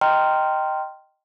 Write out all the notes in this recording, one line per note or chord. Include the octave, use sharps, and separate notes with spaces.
D#5 G5 A#5 C6 F6